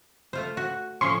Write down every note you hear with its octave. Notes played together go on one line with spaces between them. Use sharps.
A3 F4 C5
F#4
A2 F3 C#4 C6 C#6